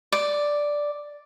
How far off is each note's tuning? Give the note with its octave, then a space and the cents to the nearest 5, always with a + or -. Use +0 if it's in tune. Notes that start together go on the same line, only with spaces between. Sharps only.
D5 +0